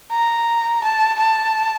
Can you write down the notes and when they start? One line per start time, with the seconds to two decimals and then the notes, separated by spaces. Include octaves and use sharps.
0.12 A#5
0.83 A5
1.19 A5